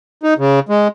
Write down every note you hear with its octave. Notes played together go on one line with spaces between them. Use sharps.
D#4
C#3
G#3